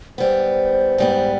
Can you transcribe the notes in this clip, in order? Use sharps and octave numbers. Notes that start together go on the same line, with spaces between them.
G#2 G3 B3 C5
G#2 G3 B3